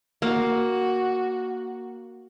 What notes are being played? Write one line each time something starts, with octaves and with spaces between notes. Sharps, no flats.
A#3 F#4